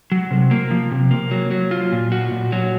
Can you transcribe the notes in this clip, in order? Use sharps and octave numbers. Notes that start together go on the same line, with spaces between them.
F#3
C3
A#3
F3
C3
A#3
F#3
F#3
F4
A#2
F#4
A#2
F#3